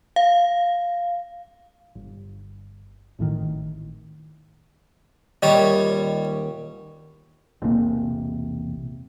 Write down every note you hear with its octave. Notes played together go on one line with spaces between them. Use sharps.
F5
G1
G#1 A2 D3 D#3
D#1 G3 C#5 D#5
E1 A#1 C3 A#3